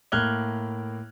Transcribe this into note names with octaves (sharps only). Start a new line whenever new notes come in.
A2 A#3 F6 F#6 G#6 G7